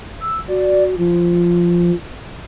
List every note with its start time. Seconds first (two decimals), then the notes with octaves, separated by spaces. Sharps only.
0.20 E6
0.48 F#4 D5
0.98 F3 F4